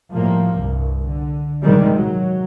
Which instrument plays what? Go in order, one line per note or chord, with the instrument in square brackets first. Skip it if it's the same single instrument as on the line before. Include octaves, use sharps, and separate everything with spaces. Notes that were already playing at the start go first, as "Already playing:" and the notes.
[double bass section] A2 F3 G3 A#3
C2 G2
D3
A#1 G#2 C3 D#3 G3 G#3
F#3